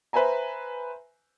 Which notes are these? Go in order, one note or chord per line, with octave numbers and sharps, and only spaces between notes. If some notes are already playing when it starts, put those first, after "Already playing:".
B4 C5 E5 G#5 A#5